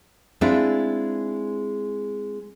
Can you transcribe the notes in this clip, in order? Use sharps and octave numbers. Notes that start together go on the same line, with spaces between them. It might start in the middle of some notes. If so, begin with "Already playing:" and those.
G#3 C4 D4 E4 F4